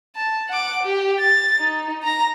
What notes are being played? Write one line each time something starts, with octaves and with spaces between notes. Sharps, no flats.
A5
F#5 D6
G4
A6
D#4
A#5 A#6